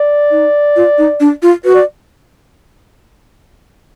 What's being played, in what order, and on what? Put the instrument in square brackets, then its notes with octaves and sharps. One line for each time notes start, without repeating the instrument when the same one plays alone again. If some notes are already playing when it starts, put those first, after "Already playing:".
Already playing: [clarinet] D5
[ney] D#4
F4
D#4
D4
F4
[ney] F#4 [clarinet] B4
[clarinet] D5